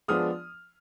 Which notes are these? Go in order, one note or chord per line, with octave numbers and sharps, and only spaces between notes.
F3 G#3 B3 D4 D#6 F6